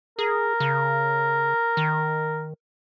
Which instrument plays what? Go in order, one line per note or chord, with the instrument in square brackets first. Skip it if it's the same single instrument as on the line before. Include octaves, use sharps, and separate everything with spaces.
[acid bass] G#4 [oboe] A#4
[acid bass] C#3
D#3